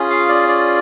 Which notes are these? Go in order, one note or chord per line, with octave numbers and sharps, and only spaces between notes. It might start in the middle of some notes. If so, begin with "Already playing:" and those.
Already playing: C#4 F4 G#4
F5
D5
D5